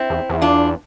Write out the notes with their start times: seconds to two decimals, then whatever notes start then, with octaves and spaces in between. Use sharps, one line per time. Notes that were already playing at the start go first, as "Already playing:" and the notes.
Already playing: C4 E4
0.10 E2
0.30 E2
0.41 D4 F4